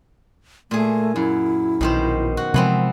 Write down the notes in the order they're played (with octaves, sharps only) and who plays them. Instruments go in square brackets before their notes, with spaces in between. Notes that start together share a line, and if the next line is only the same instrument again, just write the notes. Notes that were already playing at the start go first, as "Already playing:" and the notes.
[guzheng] A#2 G#4 [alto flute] A3
[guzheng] F#2 [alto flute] E4
[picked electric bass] A#1 [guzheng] B2 D#3 C5
[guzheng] F#4
[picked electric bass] C3 F3 G#3 [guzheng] E3 B3 C4